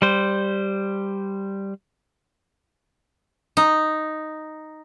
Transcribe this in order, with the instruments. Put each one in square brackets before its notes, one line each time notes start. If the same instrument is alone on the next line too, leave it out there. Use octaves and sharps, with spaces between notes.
[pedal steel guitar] G3 C5
[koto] D#4